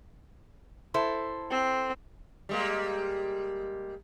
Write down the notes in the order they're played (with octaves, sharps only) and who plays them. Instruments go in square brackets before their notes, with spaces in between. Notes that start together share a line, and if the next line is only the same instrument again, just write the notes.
[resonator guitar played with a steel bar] E4 A4 C5
[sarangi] C4
[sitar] G3 G#3 A#3